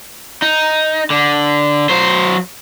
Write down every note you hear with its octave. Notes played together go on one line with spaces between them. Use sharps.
D#4
D3
F#3 C5